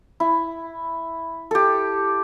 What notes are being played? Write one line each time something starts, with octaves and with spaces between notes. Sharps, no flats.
E4
G4 A4